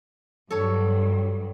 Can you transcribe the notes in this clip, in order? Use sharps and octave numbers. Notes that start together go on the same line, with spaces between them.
G2 F#3 A4 C#5